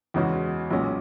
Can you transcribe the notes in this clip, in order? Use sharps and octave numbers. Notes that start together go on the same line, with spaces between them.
E2 C#3 G#3 C#4 F#4
B1 A#2 G#3 C#4